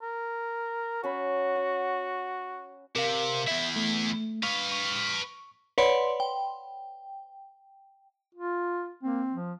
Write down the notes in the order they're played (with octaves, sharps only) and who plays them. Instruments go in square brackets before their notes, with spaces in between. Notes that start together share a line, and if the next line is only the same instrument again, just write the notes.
[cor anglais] A#4
[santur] C#4 B5 [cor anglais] F#4
[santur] F#5
[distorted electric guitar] C3 [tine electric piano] A#4 F5
[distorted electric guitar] E2 E4 [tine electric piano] E5
[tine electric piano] A3
[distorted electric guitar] B4 F5 [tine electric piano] C#6
[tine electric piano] C#6
[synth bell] B4 C#5 D5 F#5 B5 C6
G5
[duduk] F4
[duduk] A#3 [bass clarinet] C4
[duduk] F3